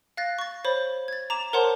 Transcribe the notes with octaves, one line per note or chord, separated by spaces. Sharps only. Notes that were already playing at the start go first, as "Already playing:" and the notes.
F5 F#6 A6 A#6
C#6 A6
C5 C#5 B5
G#6 A6
A#5 D6 E7
A#4 C5 C#5 F#5 A5 C6